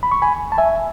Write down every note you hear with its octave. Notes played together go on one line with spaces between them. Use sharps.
B5
C#6
G#5 B5
A5
E5 G#5